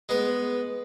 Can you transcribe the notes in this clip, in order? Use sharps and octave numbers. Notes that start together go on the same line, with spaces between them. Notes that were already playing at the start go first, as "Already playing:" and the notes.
G#3 B3 B4